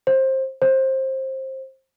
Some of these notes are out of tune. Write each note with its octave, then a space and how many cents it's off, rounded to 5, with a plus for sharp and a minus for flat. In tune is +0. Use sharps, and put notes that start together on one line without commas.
C5 +20
C5 +20